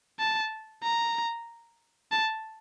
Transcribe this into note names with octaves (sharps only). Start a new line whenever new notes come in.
A5
A#5
A5